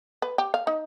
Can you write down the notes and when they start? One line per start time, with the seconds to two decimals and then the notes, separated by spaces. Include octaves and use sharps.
0.22 B4
0.38 G4
0.54 F5
0.67 D#4